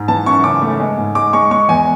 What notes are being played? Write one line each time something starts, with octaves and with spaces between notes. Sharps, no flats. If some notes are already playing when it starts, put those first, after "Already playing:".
Already playing: G#2
E3 A5
F#2 C#6
C#3 D6
A3
G#3
G#2
G#3 D6
G#3 C#6
G#3 C#6
E2 G#5